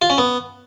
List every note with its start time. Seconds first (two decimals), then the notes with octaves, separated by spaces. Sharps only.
0.02 F4
0.10 C#4
0.18 B3